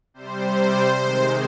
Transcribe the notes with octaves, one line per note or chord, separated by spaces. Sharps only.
C3 G3 C5
C3 D#3 G#3